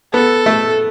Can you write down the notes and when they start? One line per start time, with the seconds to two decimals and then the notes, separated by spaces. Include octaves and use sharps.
0.14 B3 A4
0.46 A3